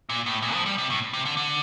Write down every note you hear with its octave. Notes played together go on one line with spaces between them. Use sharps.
A#2
A2
A#2
F3
G3
C3
A2
C3
D3
D3